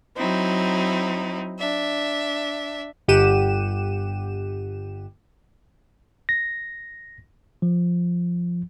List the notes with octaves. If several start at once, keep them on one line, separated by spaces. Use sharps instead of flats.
F#3 C4 D#4 E4
D4 E5
G1 G4 F#5 D#7 E7
A#6
F3